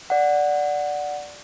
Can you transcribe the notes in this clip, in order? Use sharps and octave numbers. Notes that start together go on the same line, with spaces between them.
D5 F#5